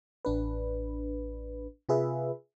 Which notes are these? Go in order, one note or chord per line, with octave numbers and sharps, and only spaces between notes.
A1 D4 B4
C3 F4 G#4 B4 E5